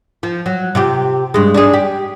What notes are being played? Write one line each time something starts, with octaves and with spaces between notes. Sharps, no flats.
F3
F#3
C3 F4 G4
G2 G#3
D4 D#4 G#4
G4